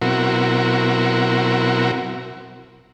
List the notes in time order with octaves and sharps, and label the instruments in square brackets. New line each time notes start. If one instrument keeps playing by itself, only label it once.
[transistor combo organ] B2 F#3 C4 E4 F#4 A#4